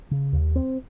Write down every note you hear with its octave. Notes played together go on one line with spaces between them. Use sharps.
C#3
D#2
C4